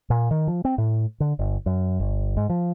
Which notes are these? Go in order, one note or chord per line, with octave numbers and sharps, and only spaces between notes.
A#2
D#3
F3
C4
A2
D3
G1
F#2
G1
G#2
F3